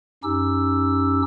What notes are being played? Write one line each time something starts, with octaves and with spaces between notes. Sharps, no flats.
F#2 C#4 D#4 G4 E6